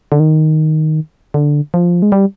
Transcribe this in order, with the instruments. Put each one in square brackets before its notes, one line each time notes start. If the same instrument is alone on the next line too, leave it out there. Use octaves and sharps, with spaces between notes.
[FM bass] D3
D#3
D3
F3
G#3
G3